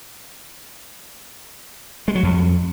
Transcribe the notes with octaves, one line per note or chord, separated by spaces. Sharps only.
G#3
F#3
F2